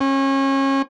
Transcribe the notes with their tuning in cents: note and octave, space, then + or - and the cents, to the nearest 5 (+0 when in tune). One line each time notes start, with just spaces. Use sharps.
C#4 -30